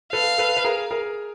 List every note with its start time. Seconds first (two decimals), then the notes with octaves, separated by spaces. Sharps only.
0.12 A4 B4 F5
0.38 A4 B4
0.57 B4
0.64 G#4 A#4
0.91 G#4 A#4